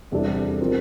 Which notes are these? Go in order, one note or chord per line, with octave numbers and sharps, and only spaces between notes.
E2 C3 G3 D4 A4
F3 C4 F4 A#4